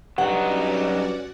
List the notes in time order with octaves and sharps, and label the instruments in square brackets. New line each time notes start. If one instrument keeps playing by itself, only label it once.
[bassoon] G2 [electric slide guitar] F#3 D#4 [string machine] C#4 F#4 D5 [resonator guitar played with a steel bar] F#5